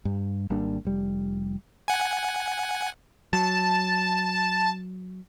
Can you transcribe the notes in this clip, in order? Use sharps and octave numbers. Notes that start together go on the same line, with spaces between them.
G2
G#1 G3 A#3 D4
F1 G3
F#5 G#5
F#3 A5